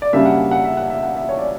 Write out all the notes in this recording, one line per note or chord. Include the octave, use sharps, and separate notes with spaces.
D5
F#2 C#3 G3 A#3 D4 E5
F#5
F#5
E5
F#5
E5
F#5
E5
C#5
D5